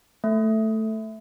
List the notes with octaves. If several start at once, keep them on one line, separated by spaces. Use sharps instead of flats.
A3